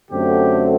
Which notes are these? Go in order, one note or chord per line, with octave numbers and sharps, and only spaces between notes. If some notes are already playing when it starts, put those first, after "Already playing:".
F#2 D3 F#3 A3 C4 G4